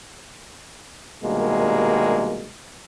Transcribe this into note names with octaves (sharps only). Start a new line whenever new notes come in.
C2 B2 D#3 G3 G#3 A#3